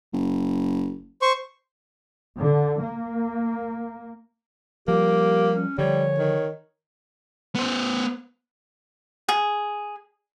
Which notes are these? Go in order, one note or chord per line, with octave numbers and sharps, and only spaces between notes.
F#1
C5 C#6
D3
A#3
F3 G3 A#3 G4
C#4
D3 F3 G3 C#5
D#3
B3 C5
G#4